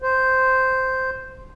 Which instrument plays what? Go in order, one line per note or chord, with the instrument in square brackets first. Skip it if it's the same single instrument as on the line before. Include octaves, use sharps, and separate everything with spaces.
[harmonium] C5